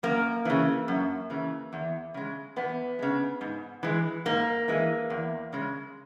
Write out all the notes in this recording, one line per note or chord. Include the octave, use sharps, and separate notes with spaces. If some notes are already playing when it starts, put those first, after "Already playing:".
F#2 A#3
C#3 E3
F#2
C#3 E3
E2
C#3 G#3
E2 B3
C#3 G#3
G#2
E3 G#3
G#2 A#3
E3 G#3
E2
C#3 G#3